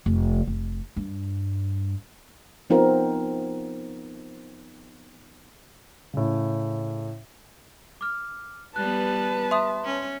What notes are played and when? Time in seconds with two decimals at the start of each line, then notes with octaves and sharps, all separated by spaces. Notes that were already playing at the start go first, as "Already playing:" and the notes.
0.06 F1
0.47 F1
0.96 G2
2.70 F3 B3 C4 D#4 F4 A#4
6.13 A2 C#3
8.01 D6 F6
8.76 G3 B3 B4 A5 F#6
9.51 E5 C6 D#6
9.85 C#4